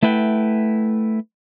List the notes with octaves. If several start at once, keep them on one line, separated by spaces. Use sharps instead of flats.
A3 E4 B4 F#5 G5